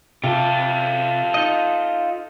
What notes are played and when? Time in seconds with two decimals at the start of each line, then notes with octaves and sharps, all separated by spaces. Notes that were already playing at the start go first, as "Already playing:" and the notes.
0.24 C3 F4 A4
1.34 D#4 D#5